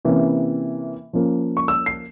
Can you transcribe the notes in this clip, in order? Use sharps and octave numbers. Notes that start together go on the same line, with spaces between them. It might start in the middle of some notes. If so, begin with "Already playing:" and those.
C3 E3 A#3 C#4
F3 A#3 C#4
C#6
E6
C7